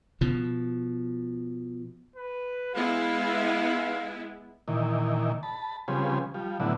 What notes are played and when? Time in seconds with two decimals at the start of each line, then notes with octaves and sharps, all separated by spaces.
0.21 B2 F3
2.16 B4
2.75 G#3 B3 E4 F5
4.68 A#2 D#3 E3
5.43 A5 B5
5.88 C#3 F3 G3 C4 G#4 B4
6.34 F3 G3
6.60 A2 D3 F#3 B3 E4